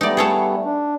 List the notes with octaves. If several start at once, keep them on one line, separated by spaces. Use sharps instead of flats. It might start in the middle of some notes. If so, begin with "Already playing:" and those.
G3 A3 B3 D#4 D5
G#4 A4 C#5
D4